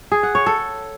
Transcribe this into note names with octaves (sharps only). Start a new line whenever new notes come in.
G#4
F#5
C#5
A4